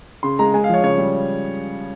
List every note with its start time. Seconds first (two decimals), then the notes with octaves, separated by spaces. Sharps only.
0.23 C#3 C6
0.39 G#3 A#5
0.54 G#3 G#5
0.64 F5
0.69 F3 C#5
0.83 C#3 C#5
0.98 G3